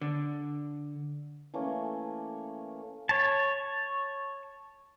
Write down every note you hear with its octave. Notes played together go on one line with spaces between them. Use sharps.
D3
E3 A3 A#3 C#4
C#5 A5